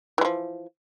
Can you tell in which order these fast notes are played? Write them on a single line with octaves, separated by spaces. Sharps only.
E3 G#3 F3